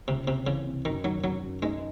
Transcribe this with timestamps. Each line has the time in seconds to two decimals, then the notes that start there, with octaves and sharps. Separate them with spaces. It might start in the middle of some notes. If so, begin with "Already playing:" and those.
0.08 C#2 C3
0.27 C3 C4
0.46 C#3 E3
0.66 C3
0.85 F#2 D#3
1.04 D#3 F#3
1.24 D#3 F#3
1.43 F#2
1.63 G#3 D#4